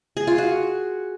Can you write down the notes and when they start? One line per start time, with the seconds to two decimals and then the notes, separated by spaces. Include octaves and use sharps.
0.17 G#4
0.27 F4
0.38 F#4